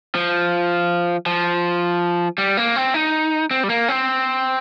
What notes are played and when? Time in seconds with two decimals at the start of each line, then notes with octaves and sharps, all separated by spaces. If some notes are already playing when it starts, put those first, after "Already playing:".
0.15 F3
1.26 F3
2.38 G3
2.57 A#3
2.76 C4
2.94 D#4
3.51 C4
3.63 G3
3.70 A#3
3.88 C4